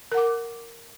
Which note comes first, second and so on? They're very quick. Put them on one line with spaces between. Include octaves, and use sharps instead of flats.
A#4 F#5 D6